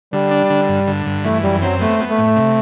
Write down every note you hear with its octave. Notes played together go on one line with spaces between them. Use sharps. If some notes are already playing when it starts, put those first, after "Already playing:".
D3 G3
D4
D3
G2
D3
G2
E3 A3
F#2 G3
F#3 C4
A3 B3
B3
A3
A2
C3